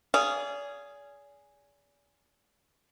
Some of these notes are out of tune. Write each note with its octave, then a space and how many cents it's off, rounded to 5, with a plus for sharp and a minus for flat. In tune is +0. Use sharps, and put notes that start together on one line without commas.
G#4 +0 D5 -40 F5 -25